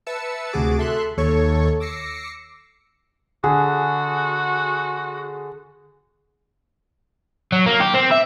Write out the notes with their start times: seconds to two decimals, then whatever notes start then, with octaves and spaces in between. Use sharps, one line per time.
0.06 B4 E5 A5 E6 C#7
0.52 D2 C3 F#4 G#4 D6 A6
0.78 A4 E5 C6 F#6
1.17 D#2 A4 C#5 C#6
1.80 D6 E6 A#6 C7 C#7
3.44 D3 F#4 G#4
7.52 F#3
7.66 A#3
7.80 G4
7.94 C4
8.11 E5